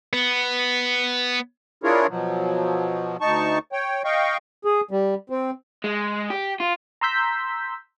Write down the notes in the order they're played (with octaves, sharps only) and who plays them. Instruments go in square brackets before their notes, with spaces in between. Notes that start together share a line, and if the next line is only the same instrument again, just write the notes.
[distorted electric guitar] B3
[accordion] D4 E4 F4 G#4 A#4 C#5
B2 F3 F#3
D2 D#4 A5 C#6
C#5 G5
D#5 F5 G5 C#6
[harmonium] G#4
G3
C4
[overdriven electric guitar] G#3
G4
F4
[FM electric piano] A#5 C6 E6 G6 B6